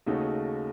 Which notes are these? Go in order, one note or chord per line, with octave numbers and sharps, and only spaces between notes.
D#2 C#3 A3 D#4 F#4